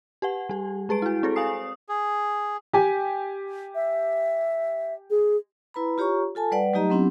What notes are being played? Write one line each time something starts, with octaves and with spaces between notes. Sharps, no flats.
G4 B4 F#5
G3 G4
G#3 G#4 B4 D7
E4 F#4
C4 G#4 A4 C5
F5 G#5 D#6 C7
G#4
G4 G#5
E5
G#4
E4 B4 A#5 B5
F4 G4 C#5 A#5 C#6
F4 A4 G#5 A5
G3 B4 D5 F#5
F#3 A3 D#4 G4 D#5 A#5
F#3 B3 C4 D4 E4 G4